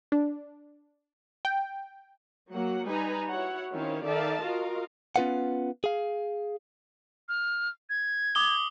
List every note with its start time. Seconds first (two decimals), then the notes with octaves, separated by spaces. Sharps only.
0.12 D4
1.45 G5
2.52 F#3 A#3 F#5
2.86 G3 D#4 B4 G#5 A#5
3.29 E4 F#4 C#5 F#5
3.72 D#3 C4 C#4 E4 C#5 F5
4.04 D#3 A4 D5 E5 F5 A5
4.42 F4 F#4 A#4 D#5 F5
5.16 B3 C#4 F4 B4 F5 F#5
5.84 G#4 F5
7.29 F6
7.90 G#6
8.35 D6 D#6 G7